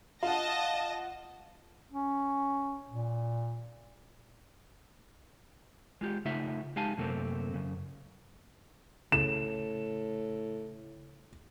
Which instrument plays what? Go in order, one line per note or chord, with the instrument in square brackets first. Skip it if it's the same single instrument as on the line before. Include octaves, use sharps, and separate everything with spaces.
[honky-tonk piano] F4 F#5 [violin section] D#5 A5 A#6
[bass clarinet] C#4
A#2
[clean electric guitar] G#3 F4 G4
C#3 A3 D#4 F4 E5
G#3 D#4 G4 F5 G#5 A5
F#2 C3 A3 A#3 C4
F#2 C#3
[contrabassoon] A2 [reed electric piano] C#3 [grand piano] E7